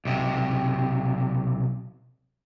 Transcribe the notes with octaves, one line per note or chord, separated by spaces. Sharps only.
B1 C3